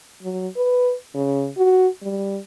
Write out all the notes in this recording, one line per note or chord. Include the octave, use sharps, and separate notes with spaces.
F#3
B4
C#3
F#4
G3